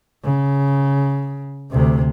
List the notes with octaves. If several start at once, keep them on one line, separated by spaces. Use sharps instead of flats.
C#3
D2 C3